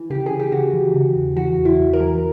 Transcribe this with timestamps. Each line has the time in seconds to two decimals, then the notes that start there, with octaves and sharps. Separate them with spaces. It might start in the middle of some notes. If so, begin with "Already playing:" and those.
Already playing: E3
0.10 C#3 G4
0.26 C#3 G#4
0.40 G4
0.52 C#3 F#4
0.73 E3
0.94 C#3
1.15 E2
1.36 E3 F#4
1.58 E2
1.65 E4
1.80 E2
1.93 A#4
2.00 E3